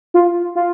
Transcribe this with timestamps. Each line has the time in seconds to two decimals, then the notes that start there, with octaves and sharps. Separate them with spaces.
0.14 F4
0.55 F4